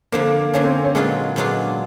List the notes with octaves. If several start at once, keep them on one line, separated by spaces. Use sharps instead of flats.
F2 D3 F3 A#3
F2 D3 F3 C#4
C4
C#4
A#2 F#3 G#3 B3 D4 F4
A#2 F#3 B3 D4 F4